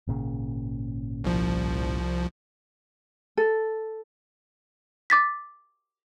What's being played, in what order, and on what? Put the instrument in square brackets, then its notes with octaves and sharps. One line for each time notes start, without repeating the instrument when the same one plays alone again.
[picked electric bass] G#1 A#2 C#3
[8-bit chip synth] C2 F3
[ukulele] A4
[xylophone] D6 A6 B6